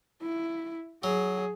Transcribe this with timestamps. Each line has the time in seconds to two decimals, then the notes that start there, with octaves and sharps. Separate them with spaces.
0.21 E4
1.04 F#3 G#4